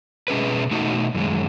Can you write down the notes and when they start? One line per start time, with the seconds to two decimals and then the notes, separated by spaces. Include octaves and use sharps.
0.28 B2 A3 C#4 G#4 B4
0.71 B2 A3 D#4 F#4
1.14 F#2 D#3 G#3